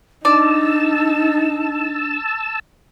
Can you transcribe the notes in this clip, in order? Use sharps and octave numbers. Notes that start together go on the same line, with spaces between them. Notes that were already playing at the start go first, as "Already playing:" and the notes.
D4 D#4 D5 A5 E6